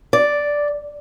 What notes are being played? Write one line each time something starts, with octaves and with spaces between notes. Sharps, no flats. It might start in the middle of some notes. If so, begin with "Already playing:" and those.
D5